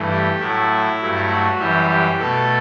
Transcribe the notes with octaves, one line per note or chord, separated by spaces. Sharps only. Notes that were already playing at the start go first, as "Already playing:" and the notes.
Already playing: G2 E3 A3
G4
A2 F#3 A3 E4
G2 F#3 A3
F#4
F#2 E3 G3 G4
G4
B2 A3 A4